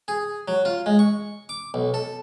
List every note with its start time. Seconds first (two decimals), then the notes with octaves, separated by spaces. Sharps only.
0.08 G#4
0.48 F#3
0.65 F4
0.86 G#3
0.99 C#6
1.49 D6
1.74 B1
1.94 A4